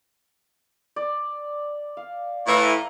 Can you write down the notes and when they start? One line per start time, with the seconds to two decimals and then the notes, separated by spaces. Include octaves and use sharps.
0.96 D5
1.97 F5
2.47 A2 E3 E4 F5 A#5